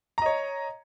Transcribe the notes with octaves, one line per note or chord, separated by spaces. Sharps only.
C#5 D#5 A#5